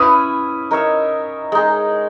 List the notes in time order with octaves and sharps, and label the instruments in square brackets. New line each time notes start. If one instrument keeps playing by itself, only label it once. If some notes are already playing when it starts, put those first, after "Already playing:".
Already playing: [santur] C#4 E4 B4 [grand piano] D#6
[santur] D#4 A#4 C#5 E5
G#3 D#4 G#4